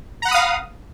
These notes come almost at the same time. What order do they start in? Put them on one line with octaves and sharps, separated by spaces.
A#5 F#5 B5 D#6 F5